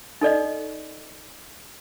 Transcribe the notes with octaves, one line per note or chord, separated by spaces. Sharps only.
D#4 A4 D5 D#5